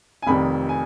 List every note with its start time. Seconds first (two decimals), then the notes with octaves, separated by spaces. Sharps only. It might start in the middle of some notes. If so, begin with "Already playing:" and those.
0.22 G#5
0.27 F1 F2 D#3 G3 B5
0.69 G#5